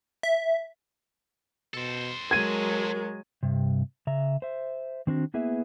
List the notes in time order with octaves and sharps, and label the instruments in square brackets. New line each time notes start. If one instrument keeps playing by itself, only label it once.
[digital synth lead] E5
[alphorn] B2 [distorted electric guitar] A4 C5
[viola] F#3 G#3 [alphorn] A#4 [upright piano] G#6 D#7
[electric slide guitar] G2 C3
C#3 E5 A#5
C5 E5
D#3 C4 D4 F#4
A#3 B3 E4 G#4 B4 E5